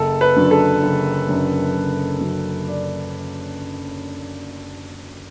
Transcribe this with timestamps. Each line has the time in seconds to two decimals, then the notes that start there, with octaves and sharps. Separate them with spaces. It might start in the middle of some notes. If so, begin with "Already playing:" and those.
Already playing: F#1 A4
0.21 B4
0.36 F#2 D3 F#3
0.51 A4
0.83 F#1
1.29 F#2 D3 F#3
1.75 F#1
2.21 F#2 D3 F#3
2.68 D5